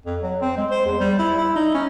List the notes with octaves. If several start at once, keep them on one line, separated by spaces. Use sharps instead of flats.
F2
F#3
C4
G#3
C5
E2
G3
E4
E4
D#4
C#4